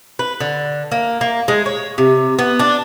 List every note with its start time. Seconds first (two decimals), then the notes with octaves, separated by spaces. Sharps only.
0.19 B4
0.40 D3
0.92 A#3
1.21 A#3
1.48 G#3
1.66 C#5
1.98 C3
2.39 B3
2.59 D4